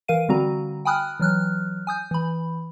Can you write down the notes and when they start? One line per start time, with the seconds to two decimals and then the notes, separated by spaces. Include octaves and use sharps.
0.08 E3 A#4 F5 D#7
0.29 D3 G3 C4 F#4 A#5
0.85 G5 G#5 B5 D#6 F6 F#6
1.20 E3 F#3 F6 F#6
1.87 G#5 D#6 G6
2.11 E3 B5